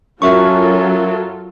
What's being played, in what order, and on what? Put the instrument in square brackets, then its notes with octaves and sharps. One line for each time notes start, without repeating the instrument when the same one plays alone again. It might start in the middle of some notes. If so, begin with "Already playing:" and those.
[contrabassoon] F#2 [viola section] F#3 F4 A4 [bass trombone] C#4 [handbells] A#4 E5 C#6